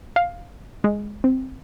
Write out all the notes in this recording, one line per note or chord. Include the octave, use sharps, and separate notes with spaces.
F5
G#3
C4